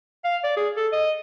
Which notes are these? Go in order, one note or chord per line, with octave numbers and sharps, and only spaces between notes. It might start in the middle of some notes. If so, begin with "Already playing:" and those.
F5
D5
G#4
A4
D#5